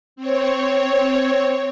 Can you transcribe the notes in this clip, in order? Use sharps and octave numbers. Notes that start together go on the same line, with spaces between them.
C4 C#5